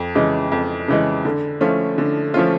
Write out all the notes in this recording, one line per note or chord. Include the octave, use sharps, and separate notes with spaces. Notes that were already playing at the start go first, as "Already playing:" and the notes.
Already playing: F2
C#3 E3 G#3
F2
C#3 E3 G#3
D3
F3 A3 C#4 F4
D3
F3 A3 C#4 F4